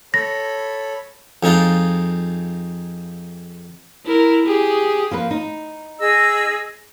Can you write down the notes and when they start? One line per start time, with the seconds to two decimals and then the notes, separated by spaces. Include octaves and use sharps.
0.14 A4 C#5 B5 A#6
1.43 F2 G#3 D#4 F4
4.05 E4 A#4
4.46 G4 G#4
5.11 F3 A#3 B4
5.31 D#4
5.99 G#4 D#5 E6